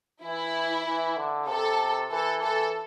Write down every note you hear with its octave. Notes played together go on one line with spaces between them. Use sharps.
E3 E4
E3
D3
C3 A4
E3 A4
E3 A4